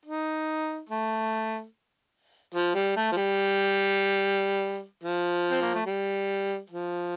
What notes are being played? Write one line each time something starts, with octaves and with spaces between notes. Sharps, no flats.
D#4
A3
F3
G3
A3
F3
G3
F3
C4
A#3
A3
G3
F3